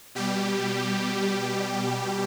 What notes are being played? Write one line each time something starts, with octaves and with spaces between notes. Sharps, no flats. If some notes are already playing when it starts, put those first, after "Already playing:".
B2 G3 G4